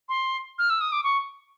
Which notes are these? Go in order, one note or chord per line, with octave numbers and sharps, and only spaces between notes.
C6
F6
E6
D#6
D6
C#6